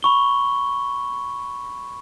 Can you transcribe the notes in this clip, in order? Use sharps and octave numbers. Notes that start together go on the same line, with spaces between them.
B5 C#6 G7